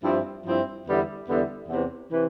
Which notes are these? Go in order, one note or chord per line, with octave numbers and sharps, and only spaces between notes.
G2 F3 C4 E4
G2 F3 C4 E4
E2 D3 G3 B3 E4
E2 D3 G3 B3 E4
E2 C3 E3
C3 E3